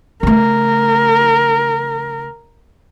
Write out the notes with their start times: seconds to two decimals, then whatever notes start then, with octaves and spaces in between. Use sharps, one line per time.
0.23 C#3 A3 A#4